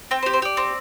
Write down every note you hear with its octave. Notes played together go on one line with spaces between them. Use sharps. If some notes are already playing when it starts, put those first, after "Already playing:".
C4 G5
C5
G4
C5
G4 D5
C4